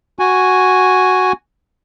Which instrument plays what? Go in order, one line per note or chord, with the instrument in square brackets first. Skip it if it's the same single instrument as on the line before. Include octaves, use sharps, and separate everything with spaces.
[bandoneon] F#4 G#5